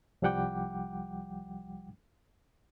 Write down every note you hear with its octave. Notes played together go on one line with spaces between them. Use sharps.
C2 F3 G3 F#5 G5 D6